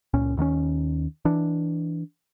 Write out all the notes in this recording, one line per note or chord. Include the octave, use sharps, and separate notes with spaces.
C#2 A#2 C#4
D#2 D#3 A#3 C#4
E3 D4